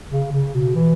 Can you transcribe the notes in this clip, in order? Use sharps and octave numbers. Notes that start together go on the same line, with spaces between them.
C#3
C#3
B2
E3